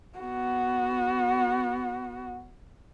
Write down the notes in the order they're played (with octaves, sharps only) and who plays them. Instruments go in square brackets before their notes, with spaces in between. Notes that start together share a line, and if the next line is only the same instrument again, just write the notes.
[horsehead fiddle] B3 F#4